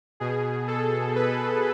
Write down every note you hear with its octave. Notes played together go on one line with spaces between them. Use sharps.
B2 G#4
A4
B4